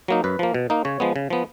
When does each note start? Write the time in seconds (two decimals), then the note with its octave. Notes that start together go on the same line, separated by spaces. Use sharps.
0.08 F#3 A#3 D#4
0.24 F#2 B4
0.39 F3 A#3
0.54 B2
0.70 A#3 D#4
0.85 C#3 C#5
1.00 F3 G#3 B3
1.16 C#3
1.30 F3 B3